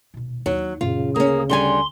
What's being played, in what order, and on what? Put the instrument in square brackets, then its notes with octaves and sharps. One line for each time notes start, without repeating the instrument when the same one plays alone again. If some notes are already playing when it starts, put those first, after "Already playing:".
[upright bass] D#1 B2
[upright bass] D#2 D#4 [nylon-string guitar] F#3
[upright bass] F#2 A#2 [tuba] C#3 [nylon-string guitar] F4
[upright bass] D2 [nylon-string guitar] A#3 C#4 [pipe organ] G#4
[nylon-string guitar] D3 G3 G#5 [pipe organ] C6